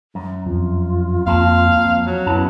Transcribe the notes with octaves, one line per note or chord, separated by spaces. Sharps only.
F#2
F2 F4
F2 A#3 C4 F5 A5
F2
F#3
F#2 B3 E4 A5